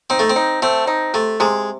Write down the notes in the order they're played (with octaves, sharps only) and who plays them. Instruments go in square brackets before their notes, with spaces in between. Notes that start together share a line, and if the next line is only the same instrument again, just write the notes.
[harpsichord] C4 [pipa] D#4
[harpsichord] A3
C4
[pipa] D#4
[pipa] A3 [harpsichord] C4
[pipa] D#4
[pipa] C3 [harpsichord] A3
[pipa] C3 [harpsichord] G#3